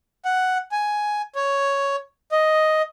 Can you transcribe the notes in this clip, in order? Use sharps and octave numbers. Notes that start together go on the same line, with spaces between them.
F#5
G#5
C#5
D#5